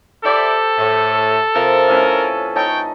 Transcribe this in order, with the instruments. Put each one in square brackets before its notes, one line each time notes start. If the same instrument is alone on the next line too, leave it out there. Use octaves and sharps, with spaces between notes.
[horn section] E4 D5 [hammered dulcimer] G4 C5 G5 [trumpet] A4
[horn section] A2
[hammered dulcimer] C3 F3 [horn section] A#4
[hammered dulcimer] A2 C#4 B4
[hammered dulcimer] D#4 A5 [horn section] C#5 G5